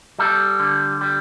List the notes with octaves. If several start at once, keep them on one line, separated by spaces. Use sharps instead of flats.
G3 A4
D3
G3